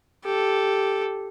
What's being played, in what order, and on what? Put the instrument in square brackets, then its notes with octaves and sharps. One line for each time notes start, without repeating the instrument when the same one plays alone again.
[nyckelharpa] G4 A4